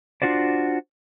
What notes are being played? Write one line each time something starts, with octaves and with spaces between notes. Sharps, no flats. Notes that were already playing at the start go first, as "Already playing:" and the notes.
D4 F4 F#4 C5 D5